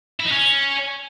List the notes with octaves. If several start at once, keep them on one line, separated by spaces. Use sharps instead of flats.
E4
D#4
C#4